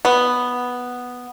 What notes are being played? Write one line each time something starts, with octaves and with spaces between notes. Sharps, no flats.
B3